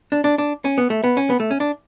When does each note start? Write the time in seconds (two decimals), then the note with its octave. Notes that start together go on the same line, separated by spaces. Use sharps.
0.12 D4
0.24 D4
0.38 D4
0.65 C#4
0.78 B3
0.90 A3
1.04 B3
1.17 C#4
1.30 B3
1.40 A3
1.51 C#4
1.60 D4